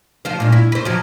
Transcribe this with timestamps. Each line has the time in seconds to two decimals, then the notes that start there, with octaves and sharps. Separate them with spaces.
0.25 F3 F4 C5
0.40 G2 A#2
0.52 E4
0.72 B4 C5
0.85 F3 F#3